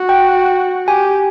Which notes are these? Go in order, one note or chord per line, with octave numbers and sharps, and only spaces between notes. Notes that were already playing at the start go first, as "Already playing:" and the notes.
Already playing: F#4
G5
G4 G#5